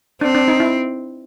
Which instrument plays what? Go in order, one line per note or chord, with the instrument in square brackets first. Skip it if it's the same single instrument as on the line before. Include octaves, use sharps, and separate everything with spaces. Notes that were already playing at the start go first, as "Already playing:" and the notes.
[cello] C4 [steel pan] D4
[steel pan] D4
D#4
E4